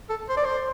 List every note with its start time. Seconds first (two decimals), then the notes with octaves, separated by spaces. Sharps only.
0.09 A4
0.29 C5
0.37 D5
0.45 C5